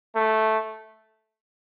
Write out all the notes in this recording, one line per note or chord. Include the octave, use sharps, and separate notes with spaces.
A3